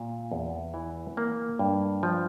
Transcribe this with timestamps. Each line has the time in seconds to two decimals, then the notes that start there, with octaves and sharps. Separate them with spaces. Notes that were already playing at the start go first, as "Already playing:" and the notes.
Already playing: A#2
0.32 E2
0.74 E3
1.17 A#3
1.59 G2
2.03 F3